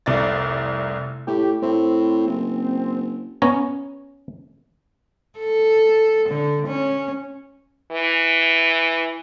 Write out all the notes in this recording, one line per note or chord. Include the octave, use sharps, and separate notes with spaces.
F1 C2 D5 A6
A2 G4
A2 C4
F#1
B3 C#4 C#5 A#5
A4
D3
C#4
E3